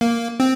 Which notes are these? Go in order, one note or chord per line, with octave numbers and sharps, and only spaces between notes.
A#3
C4